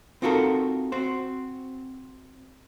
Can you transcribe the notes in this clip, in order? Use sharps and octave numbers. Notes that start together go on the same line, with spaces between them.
C4 D#4 F4 F#4 A4 A#4
C4 F#4 C5